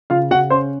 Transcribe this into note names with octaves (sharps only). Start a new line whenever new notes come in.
C#3 F4 F5
C#3 F#4 F#5
C#4 C5 C6